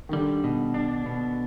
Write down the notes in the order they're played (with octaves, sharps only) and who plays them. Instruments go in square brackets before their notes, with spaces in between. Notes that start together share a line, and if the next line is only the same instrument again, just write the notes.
[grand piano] D#3
[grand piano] D3 [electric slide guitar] G3
[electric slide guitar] B2
D4
B2